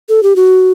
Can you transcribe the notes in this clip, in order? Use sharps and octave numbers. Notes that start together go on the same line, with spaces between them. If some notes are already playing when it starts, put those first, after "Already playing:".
A4
G4
F#4